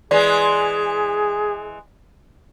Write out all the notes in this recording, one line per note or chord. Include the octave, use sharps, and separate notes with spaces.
E3 G#3 G#4 D5